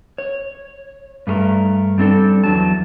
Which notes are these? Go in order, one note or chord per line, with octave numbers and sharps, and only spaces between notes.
C#5
G2 A3 G#4 A#4
G3 C4 D4 A4
E2 F#3 A5